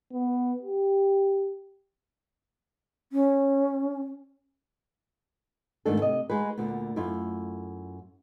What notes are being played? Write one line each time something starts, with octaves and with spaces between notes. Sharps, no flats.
B3
G4
C#4
F2 G#2 D#3 A3 D4 A4
C3 D#5
G#3 D#4 F#4 B4
D2 A#2 D3 B3
F#2 A3 E4 F4